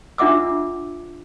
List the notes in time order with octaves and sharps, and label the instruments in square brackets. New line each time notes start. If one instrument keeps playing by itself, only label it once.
[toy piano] D4 F4 E5 F#5 D6 E6